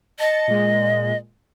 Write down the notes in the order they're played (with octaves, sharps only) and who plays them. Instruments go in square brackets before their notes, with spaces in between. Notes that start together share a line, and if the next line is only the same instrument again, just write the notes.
[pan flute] D#5 [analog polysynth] A5 A6 C#7
[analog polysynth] A#2 G#3